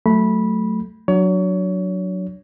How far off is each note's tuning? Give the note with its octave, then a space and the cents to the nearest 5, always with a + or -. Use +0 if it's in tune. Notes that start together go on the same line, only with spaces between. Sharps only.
F#3 +0 A3 +0 B5 -15
F#3 +0 D4 +0 C#5 +30